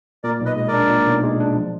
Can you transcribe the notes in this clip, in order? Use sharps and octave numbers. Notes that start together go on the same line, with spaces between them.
A#2 A#4 D5
B1
B4 D#5
G#3 D#5
A#4 D5
D4
A#2
B1
G#3
D4
F3